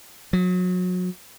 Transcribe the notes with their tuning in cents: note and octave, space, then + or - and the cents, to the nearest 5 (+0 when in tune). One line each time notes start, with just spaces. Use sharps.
F#3 -30